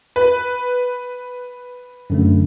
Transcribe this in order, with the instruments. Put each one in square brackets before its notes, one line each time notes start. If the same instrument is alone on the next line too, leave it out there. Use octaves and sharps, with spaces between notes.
[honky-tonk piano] B4
[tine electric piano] F#2 D3 A3